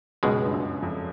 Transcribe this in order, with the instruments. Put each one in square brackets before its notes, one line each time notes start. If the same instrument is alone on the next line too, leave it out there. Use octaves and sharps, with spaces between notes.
[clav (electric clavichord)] C#2 B2 G#3 [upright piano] F#2
[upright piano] G2
F#2
F2